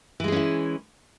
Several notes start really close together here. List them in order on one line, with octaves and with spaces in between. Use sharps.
E3 G#3 G#4 C#4 E4